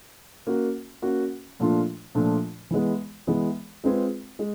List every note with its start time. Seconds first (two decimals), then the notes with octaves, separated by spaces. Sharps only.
0.47 A#3 C#4 F#4
1.02 A#3 C#4 F#4
1.60 A#2 F3 A3 D4 F4
2.15 A#2 F3 A3 D4 F4
2.71 E3 G#3 B3
3.27 E3 G#3 B3
3.84 G#3 C4 F4 G#4 B4
4.39 G#3